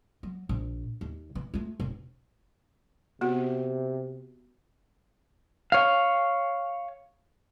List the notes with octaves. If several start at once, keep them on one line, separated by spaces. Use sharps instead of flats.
F#3
A#1
D#2
E3
A3 F4
E1
C3 B3 F#4
C#5 F5